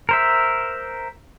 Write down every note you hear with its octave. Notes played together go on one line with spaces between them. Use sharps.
A#4 C5 E5